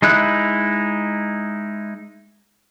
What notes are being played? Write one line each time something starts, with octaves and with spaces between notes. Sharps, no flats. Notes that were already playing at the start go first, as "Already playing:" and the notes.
G#3 D#4 E4 F#6